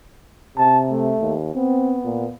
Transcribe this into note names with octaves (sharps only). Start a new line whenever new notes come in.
C3 A5
A3
D#2
B3 C4
A#2